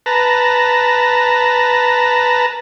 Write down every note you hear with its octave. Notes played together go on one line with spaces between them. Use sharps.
B4 A5 A#5